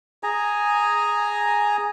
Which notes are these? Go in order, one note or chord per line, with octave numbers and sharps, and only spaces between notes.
G#4 G#5 A#5